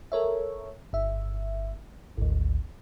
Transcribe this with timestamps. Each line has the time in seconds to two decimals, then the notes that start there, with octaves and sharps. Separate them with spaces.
0.12 A4 A#4 C#5 E5
0.93 G1 E5
2.17 G#1 D2